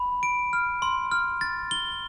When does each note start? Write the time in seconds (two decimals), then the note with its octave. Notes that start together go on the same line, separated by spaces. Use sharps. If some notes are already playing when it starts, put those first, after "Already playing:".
Already playing: B5
0.23 D7
0.53 F6
0.82 C6
1.12 F6
1.41 A6
1.71 G7